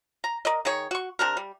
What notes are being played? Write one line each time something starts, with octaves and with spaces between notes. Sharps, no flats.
A#5
A#4 D5 D#5
D#3 G#4 C#5
F#4 C#6
C3 D4 G4 A#4
G3